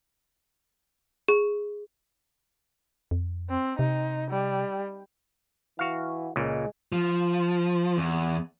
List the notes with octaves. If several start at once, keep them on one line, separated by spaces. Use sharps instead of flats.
G#4
F2
C4
C3 D#4
G3
E3 F#4 F5
C#2 A#2 G#3
F3
E2